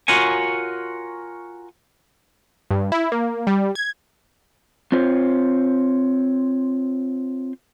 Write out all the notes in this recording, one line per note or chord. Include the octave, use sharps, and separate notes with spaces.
F4 F#4 A#4 C#5 G#5
G2
E4
A#3
G3
G#6
C4 F4 C5 C#5